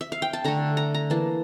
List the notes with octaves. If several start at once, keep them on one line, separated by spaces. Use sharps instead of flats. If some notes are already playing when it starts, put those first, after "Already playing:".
E5
F5
G5
A5
D3 A3 A#5
A#5
A#5
E3 A#3 A5